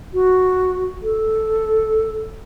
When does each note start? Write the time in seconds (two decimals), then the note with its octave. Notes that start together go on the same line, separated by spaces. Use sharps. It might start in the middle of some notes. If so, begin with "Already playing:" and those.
0.14 F#4
1.03 A4